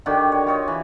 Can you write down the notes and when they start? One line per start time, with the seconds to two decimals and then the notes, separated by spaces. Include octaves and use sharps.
0.06 D3 D#3 F#4 G4
0.32 C#5
0.47 F4 C#5 D#5
0.68 E3